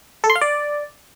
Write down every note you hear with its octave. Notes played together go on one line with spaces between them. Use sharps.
A4
C6
F5
D5